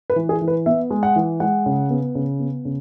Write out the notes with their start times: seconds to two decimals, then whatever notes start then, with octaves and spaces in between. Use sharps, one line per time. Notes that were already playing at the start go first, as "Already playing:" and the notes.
0.10 B4
0.16 E3
0.29 G#4
0.41 E3
0.48 B4
0.66 B3 E5
0.91 G#3
1.03 F#5
1.16 E3
1.40 G#3 F#5
1.66 C#3
1.90 B3
2.15 C#3
2.40 B3
2.65 C#3